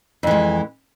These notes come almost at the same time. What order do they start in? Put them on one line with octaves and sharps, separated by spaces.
F2 E3 G#3